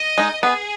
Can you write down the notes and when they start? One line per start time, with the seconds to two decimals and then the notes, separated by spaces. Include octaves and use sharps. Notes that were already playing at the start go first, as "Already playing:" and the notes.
Already playing: D#5
0.18 G#3 D#4
0.43 B3 G#4